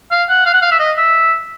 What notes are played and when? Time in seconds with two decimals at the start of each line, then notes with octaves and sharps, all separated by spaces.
0.11 F5
0.29 F#5
0.46 F5
0.54 F#5
0.62 F5
0.71 E5
0.79 D#5
0.97 E5